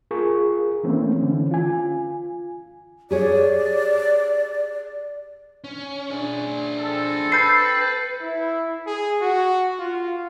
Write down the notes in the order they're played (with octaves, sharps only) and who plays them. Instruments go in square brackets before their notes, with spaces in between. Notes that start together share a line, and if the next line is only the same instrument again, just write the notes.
[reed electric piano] F4 G#4 A#4 C#6
E3 A3 A#3 C4 C#4
D3 E3 C#4
F4 G#5
[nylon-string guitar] G4 G#4 C#5 [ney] D5
[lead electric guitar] C#4
D4 G#4
[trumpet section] C4 A4
[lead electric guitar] B4 [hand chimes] B5 A6 [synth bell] G6 C7
[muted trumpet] E4
G#4
F#4
F4